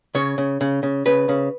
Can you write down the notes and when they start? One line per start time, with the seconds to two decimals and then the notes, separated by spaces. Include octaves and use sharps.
0.15 C#3 C#5
0.38 C#3
0.61 C#3
0.83 C#3
1.06 C#3 B4
1.29 C#3